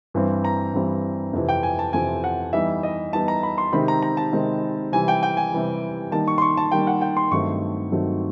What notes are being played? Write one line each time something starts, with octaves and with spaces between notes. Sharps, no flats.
G2 E3 G3 C4
A#5
G2 E3 G3 C4
F2 C3 E3
G5
G#5
A5
F2 C3 E3 G#5
F#5
E3 G3 B3 D#4 E5
D#5
E3 G3 B3 D#4 A5
A#5
B5
C6
C3 D#3 G#3 C4 B5
A#5
A#5
A5
C3 D#3 G#3 C4
C3 E3 G3 G#5
G5
G5
G#5
C3 E3 G3
D#3 G3 A#3 A5
C#6
C6
C#6
A5
D#3 G3 A#3 G5
F#5
G5
C6
G2 D#3 F#3 A3 C4 C#6
G2 D#3 F#3 A3 C4